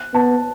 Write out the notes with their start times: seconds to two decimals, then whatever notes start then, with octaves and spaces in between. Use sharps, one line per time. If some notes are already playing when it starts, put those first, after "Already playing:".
Already playing: F#6
0.14 B3 A5